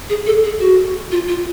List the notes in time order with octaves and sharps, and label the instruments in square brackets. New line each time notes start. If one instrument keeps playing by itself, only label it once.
[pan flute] G#4
A4
G#4
F#4
F4
F4